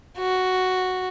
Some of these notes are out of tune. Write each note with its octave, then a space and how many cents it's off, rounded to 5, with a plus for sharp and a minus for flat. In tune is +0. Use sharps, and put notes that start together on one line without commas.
F#4 +0